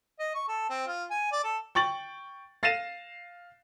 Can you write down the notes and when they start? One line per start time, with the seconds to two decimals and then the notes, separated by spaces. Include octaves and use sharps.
0.20 D#5
0.35 C#6
0.48 A4
0.70 C4
0.87 F4
1.11 G#5
1.32 D5
1.44 A4
1.75 G5 C#6 A6 F#7
2.63 F5 A6 A#6 C7 D#7 E7